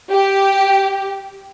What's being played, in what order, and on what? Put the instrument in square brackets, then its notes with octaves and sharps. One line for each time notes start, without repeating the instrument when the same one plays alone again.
[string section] G4